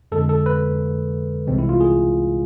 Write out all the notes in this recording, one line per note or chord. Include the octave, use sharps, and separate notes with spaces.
F2 D3 G#3 A4
A4
B4
C2 C3 E3 G#3 C4
E4
F4
G#4